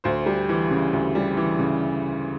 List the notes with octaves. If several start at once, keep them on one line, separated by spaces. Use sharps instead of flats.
D2 C5
G3
E3
C#3
D2
G3
E3
C#3